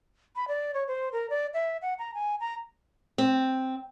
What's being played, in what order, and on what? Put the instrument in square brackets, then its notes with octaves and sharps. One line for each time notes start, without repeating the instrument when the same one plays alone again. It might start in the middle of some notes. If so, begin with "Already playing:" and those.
[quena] B5
D5
C#5
C5
A#4
D5
E5
F#5
A#5
G#5
A#5
[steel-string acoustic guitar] C4